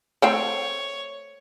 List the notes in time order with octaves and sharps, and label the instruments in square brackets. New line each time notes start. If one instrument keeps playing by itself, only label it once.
[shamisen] A3 C4 G5 [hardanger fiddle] C#5